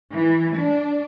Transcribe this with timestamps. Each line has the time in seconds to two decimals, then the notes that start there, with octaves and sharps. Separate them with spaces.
0.12 E3
0.57 D4